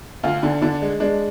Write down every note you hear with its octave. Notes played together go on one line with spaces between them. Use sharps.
D2 F4
D3
D3 D4
G#3
G#3 D4